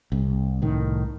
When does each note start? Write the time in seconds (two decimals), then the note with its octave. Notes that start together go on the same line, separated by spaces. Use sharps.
0.12 C2
0.62 C2 A2 D#3